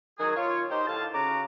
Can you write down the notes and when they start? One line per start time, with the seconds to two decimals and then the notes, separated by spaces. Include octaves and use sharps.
0.19 D#3 F#3 G#4
0.36 F4 C#5
0.70 D#4 G4 C5
0.87 A2 D3 F5 A5
1.14 C#3 F#4 A#5 D6